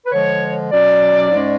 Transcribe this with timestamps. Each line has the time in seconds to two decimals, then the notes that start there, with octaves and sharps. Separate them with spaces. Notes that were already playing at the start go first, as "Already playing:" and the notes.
0.05 B4
0.12 D3 F3 G#3 C#5
0.72 B2 F#3 C#4 D5
1.31 G#2 G#3 C#4